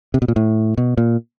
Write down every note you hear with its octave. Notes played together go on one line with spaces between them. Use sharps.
C3
B2
A#2
A2
B2
A#2